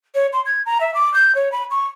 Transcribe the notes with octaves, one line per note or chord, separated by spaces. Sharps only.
C#5
C6
G#6
A#5
E5
D6
G6
C#5
B5
C#6